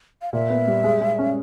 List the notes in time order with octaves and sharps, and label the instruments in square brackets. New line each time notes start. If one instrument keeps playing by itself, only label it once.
[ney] F5
[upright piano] A#2 [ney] E5
[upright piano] B3
G3
G#3
G#3
C#4